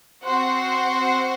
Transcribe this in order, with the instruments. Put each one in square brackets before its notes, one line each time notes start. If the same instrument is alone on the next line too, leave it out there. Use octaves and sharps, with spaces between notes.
[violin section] C4 F#4 C5 F#5